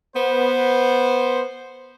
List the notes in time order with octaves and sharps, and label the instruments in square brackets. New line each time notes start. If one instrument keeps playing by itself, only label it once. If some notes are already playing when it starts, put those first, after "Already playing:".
[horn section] B3 C5